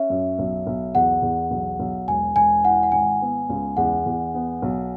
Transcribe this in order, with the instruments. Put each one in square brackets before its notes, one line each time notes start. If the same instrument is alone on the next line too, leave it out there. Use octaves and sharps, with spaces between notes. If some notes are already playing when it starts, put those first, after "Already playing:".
Already playing: [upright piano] C#4 [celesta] E5
[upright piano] F#2
B1
B1
[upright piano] E2 [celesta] F#5
[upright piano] E2
B1
B1
[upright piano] E1 [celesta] G#5
[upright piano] E1 [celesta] G#5
[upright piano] E4 [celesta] F#5
[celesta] F#5
[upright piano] G#1 [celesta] G#5
[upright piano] B3
C#2
[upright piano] E2 [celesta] F#5
[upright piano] E2
B3
B1